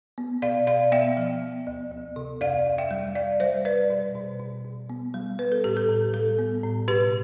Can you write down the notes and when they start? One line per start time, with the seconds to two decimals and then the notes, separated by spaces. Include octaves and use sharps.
0.18 B3
0.42 B2 D5 F5
0.67 B2 D5 F5
0.92 B3 E5 G5
1.17 F3
1.42 B3
1.67 D2
1.91 D2
2.16 C3
2.41 F2 D5 F5
2.66 F2
2.78 E5 G5
2.91 G3
3.15 F2 D5 F5
3.40 G3 C5 E5
3.65 G3 B4 D5
3.90 B2
4.15 B2
4.40 B2
4.65 B2
4.90 B3
5.14 G3
5.39 B3 B4
5.52 A4
5.64 A2 G4
5.77 A4
5.89 A2
6.13 G3 A4
6.39 B3
6.63 A2
6.88 B2 G4 B4